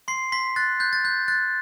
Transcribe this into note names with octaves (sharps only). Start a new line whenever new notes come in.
C6 C7
C6 B6
F#6 A6
F#6 G6
A6
F#6 G6
F#6 A6